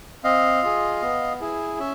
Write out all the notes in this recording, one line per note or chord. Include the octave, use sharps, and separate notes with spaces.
C4 D#5 F5
F4 G#4
B3
E4 G#4
C#4 E5